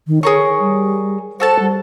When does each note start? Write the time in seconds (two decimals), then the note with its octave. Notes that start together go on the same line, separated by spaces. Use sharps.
0.07 D#3
0.23 G#4 A#4 C#5 C#6
0.59 G3
1.40 F#4 A4 C5 A5
1.60 G3